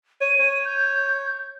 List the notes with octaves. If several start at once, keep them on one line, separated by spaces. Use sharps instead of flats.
C#5 D#7
C#5
G6